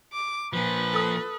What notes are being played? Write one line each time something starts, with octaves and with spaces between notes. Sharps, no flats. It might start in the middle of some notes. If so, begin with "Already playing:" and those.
D6
A#2 F3 B4
A4 D#6